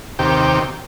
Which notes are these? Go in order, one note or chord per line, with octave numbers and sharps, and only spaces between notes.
D#2 C3 G4